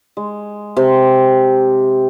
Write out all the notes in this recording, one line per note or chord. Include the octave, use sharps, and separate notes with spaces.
G#3
C3